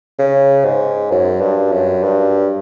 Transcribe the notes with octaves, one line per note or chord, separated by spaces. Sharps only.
C#3
G#2
F#2
G2
F#2
G2